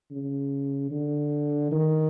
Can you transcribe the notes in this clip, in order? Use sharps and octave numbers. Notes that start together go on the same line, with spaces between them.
C#3
D3
D#3